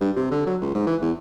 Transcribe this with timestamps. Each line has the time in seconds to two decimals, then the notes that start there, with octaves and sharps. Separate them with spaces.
0.01 G2
0.17 C3
0.32 D3
0.46 F#3
0.61 C#2
0.75 G#2
0.86 E3
1.02 E2